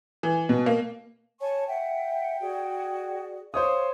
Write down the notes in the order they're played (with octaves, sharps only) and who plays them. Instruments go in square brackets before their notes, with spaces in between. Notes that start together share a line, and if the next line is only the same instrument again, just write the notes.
[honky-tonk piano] E3
B2
A#3
[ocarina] C#5 [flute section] G#5 A5 C#6
[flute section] E5 F#5 [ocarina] G5
[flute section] F#4 G#4 D5
[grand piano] C5 C#5 D#6 [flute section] F5 C#6